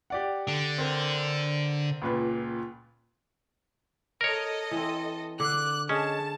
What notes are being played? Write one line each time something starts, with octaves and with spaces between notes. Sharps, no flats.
G4 D5 F#5
D3
C4 A#4
C#2 A#2 B4
A4 A#4 C#5 D#5
E3 C4
D3 D6 F#6
C#4 G#4 D#5 A5